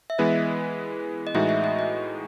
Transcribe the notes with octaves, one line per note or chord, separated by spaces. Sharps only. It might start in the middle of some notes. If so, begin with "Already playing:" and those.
E5
E3 G#3 B3 E4 B4 D#5
D#5
A2 E3 G#3 D#4 F#4 E5
E5
D#5
D#5